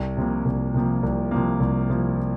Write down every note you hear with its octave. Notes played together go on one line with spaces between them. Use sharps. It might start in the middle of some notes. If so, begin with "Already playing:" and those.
Already playing: C2
C3 F3 A#3
C2
C3 F3 A#3
C2
C3 F3 A#3
C2
C3 F3 A#3